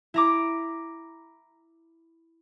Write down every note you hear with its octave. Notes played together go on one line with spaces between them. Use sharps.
E4 A#5 D6